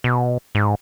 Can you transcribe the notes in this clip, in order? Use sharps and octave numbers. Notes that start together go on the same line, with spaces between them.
B2
G#2